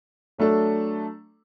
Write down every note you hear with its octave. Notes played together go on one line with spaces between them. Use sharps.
F#3 A3 D4 A4